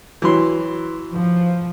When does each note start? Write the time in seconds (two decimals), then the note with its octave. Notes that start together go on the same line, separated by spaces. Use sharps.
0.22 E3 F#3 C6
1.16 F3